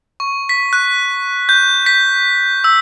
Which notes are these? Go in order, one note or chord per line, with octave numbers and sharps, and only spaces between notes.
C#6
B6
F#6
G6
B6
E6